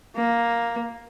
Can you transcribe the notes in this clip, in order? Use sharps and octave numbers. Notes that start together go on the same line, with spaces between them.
A#3